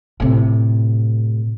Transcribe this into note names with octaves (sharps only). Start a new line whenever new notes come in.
A2 C3